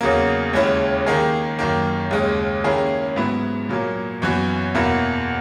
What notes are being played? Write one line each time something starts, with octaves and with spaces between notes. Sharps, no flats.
E2 C#3 F#3 A#3
D#2 C#3 G#3 C#4 E4
D#3 A#3 D#4 G#4
F#2 D#3 A#3
D#2 C#3 G#3
D#3 A#3 C#4 E4 G#4
G#2 F#3 B3 E4
A#2 F#3 A#3
F#2 E3 B3 F#4
E2 B2 A#3 E4